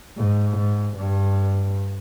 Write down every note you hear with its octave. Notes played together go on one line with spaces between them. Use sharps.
G#2
G#2
G2